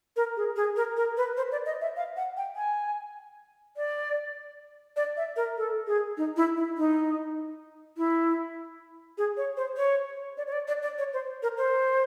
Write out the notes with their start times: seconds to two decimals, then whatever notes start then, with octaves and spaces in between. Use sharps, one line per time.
0.16 A#4
0.37 G#4
0.56 G#4
0.76 A#4
0.97 A#4
1.17 B4
1.37 C5
1.52 D5
1.66 D#5
1.81 E5
1.96 F5
2.17 F#5
2.37 G5
2.56 G#5
3.77 D5
4.96 D5
5.17 E5
5.36 A#4
5.58 A4
5.87 G#4
6.17 D#4
6.37 E4
6.57 E4
6.78 D#4
7.97 E4
9.18 G#4
9.37 C#5
9.57 C5
9.77 C#5
10.37 D5
10.47 C#5
10.52 D5
10.68 D5
10.83 D5
10.98 C#5
11.13 C5
11.43 A#4
11.58 C5